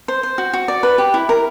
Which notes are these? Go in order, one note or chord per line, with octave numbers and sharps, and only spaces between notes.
C5
C5
F#4
F#4
D5
B4
G4
E4
A#4